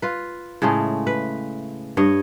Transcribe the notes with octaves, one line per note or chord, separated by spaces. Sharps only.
F4 B4
A2 C#3 G#3 A3
B4
G2 C#5 D#5